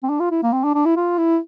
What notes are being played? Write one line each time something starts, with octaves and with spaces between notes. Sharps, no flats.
C4
D4
F4
E4
A#3
C4
D4
D4
E4
F4
E4